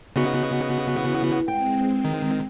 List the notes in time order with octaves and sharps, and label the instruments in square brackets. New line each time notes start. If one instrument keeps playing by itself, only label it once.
[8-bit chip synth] C#3 B3 F#4 [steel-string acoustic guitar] D#4
[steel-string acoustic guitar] E3
[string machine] G#3 C4 [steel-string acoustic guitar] G5
[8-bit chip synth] D#3